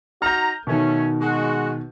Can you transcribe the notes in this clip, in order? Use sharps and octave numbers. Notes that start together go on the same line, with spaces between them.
D#4 F#4 A#5 F6 G6
B2 D#3 A3 C#4
G#3 F#4